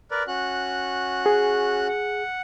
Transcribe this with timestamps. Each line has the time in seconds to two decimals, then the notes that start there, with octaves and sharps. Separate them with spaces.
0.11 A#4 B4 D5
0.27 C#4 F#4 F#6
1.26 G#4
1.88 F#5